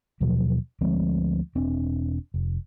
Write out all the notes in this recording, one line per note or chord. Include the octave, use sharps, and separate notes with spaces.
D#2 B2 F3 F#3
D2 F3 G#3 C4
E1 C4 D4
F1